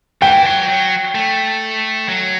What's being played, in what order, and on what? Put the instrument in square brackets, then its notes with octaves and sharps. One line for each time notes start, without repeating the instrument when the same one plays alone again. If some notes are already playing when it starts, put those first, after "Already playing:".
[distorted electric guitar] E3 [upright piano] G5
[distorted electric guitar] F#3
F#3
A3
F#3